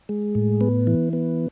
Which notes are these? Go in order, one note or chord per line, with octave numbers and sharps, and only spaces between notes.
G#3
A2
B3
E3
B3